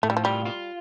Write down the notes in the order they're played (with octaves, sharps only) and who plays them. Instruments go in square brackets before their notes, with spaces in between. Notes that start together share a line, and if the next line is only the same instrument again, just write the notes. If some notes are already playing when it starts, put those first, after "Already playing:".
[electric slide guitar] A2 [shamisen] A3
[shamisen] G3
F3
[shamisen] G3 [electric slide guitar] F4
[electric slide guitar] F4